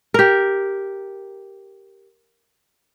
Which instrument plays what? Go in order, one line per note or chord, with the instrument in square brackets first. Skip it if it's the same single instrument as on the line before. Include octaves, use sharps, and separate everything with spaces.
[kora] G4 A#4